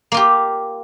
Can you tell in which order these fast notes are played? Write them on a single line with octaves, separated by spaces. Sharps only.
A#3 F4 G4